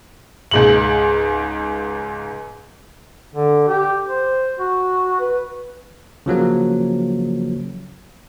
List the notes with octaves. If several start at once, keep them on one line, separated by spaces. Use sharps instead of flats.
C#2 G#2 F#7
D3
G4
C5
F#4
B4
C#3 F3 F#3 A#3